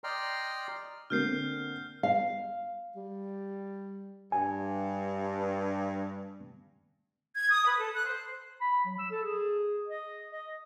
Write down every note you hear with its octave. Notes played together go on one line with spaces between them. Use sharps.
D5 D#5 G5 A#5 C6 F6
D3 A#3 C4 F6 G6 C7
F5
G3
G2 G#5
G#6
D#6
B4
A4
F#6
C5
B5
F#3
E6
A4
G#4
D#5
D#5